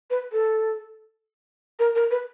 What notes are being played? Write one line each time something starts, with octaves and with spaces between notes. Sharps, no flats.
B4
A4
A#4
A#4
B4